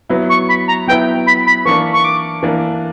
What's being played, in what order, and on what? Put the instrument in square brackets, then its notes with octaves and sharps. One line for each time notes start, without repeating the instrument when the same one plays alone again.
[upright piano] F#3 B3 E4
[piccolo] C#6
B5
A#5
[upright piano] F#3 B3 E4 [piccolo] G5
[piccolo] B5
B5
[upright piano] E3 A#3 D4 [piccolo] C#6
[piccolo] C#6
D6
[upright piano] E3 A#3 D4